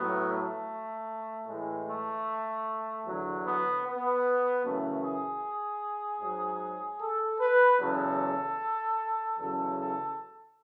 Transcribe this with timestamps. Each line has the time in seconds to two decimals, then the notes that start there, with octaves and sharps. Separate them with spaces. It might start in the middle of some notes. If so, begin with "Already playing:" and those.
Already playing: A2 F#3 B3
0.29 A3
1.47 A2 E3 G#3
1.88 A3
3.06 E2 D3 F#3
3.45 B3
3.85 B3
4.64 F#2 C#3 E3 A3
5.03 G#4
6.21 G#2 F#3
7.00 A4
7.40 B4
7.80 E2 C#3 F#3 A4
9.37 E2 C#3 F#3 A4
9.77 A4